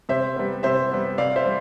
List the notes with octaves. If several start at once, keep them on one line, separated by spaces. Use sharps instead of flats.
C3 C5 E5
G3 B3
C3 C5 E5
G3 B3
C3 D5 F5
C5 E5
G3